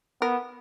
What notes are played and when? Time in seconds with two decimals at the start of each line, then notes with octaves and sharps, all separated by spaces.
0.22 B3 A#4